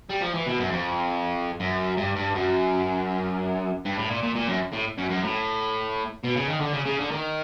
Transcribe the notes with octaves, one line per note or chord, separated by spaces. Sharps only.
G3
F3
E3
B2
F#2
F2
F#2
G2
G2
F#2
G2
A2
A#2
A#2
A#2
F#2
A2
F#2
F#2
A2
B2
C#3
D#3
D3
C#3
C#3
D3
D#3